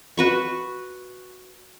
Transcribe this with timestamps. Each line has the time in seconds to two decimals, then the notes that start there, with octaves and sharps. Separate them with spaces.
0.17 F#4 B4 C#6